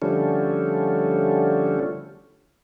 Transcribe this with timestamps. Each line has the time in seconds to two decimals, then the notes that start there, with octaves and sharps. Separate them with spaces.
0.02 D3 F3 G3 A3 C#4